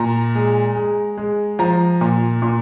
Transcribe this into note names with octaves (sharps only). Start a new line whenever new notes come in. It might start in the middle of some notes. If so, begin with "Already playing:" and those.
Already playing: A#2 A#5
G#3
G#3
G#3
F3 A#5
A#2
A#2